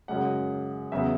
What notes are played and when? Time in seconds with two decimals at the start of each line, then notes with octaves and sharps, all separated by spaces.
0.08 F#2 C#3 G#3 F#5
0.91 E2 C#3 F#3 B3 E5